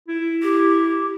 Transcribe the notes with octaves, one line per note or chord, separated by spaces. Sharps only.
E4
G4